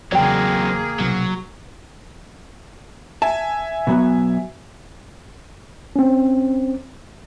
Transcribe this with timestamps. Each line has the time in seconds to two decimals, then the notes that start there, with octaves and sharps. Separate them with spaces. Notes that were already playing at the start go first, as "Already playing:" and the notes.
0.12 E2 C#3 F#3 A#3 C4 G#4 D5 G5
1.00 B1 C3 F#3
3.22 E5 G#5 A5
3.87 B2 F#3 B3
5.96 C4 C#4